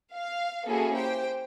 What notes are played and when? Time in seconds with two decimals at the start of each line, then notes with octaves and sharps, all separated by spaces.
0.14 F5
0.66 A#3 C#4 E4 F#4 G#4 A4
0.96 G4 C5 G5